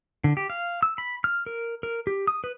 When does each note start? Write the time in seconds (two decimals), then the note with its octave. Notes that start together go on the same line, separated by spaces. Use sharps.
0.24 D3
0.37 G4
0.50 F5
0.82 E6
0.98 B5
1.24 F6
1.46 A#4
1.83 A#4
2.07 G4
2.27 D#6
2.44 B4